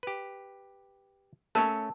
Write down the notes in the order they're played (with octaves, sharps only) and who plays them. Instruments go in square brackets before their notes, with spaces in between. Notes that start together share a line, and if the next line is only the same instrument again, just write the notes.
[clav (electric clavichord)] G4 B4
[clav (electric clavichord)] A3 C#4 C#5 [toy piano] A#4 A5